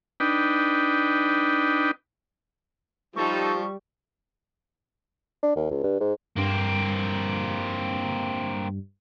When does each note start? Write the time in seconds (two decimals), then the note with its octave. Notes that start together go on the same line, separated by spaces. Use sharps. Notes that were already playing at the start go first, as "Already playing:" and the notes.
0.20 D4 D#4 B4 G5
3.16 F3 G3 D#4 A4 C#6
5.43 D4
5.56 D#2
5.71 C#2
5.84 G2
6.01 G#2
6.37 G2 A#3 C4